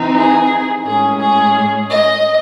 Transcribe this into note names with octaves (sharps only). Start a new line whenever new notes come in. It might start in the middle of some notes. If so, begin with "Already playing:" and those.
Already playing: E3 C4 D#4
G#4
A2 G#3 C#4 G#4
G#4
D#5